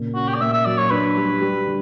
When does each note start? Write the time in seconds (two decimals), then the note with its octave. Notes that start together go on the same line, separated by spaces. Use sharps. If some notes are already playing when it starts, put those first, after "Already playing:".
Already playing: A#2 C#3
0.15 C#4 F#4
0.28 G4
0.34 D5
0.41 A#2 E5
0.53 E5
0.65 F#3 D5
0.78 C#5
0.90 D4 B4
1.16 G3
1.41 G3
1.66 D3